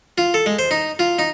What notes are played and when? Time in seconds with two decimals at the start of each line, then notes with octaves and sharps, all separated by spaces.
0.18 F4
0.34 A4
0.46 G#3
0.59 C5
0.71 D#4
0.99 F4
1.19 D#4